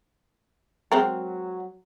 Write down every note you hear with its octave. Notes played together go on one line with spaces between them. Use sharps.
F#3 G#3 C4 A#4